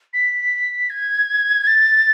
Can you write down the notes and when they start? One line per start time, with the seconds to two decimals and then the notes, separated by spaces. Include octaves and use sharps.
0.13 B6
0.90 G#6
1.67 A6